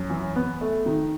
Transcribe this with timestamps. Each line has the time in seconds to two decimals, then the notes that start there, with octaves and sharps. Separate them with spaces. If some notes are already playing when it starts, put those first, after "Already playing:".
Already playing: F#2
0.10 E3
0.36 B3
0.61 A3
0.86 D#3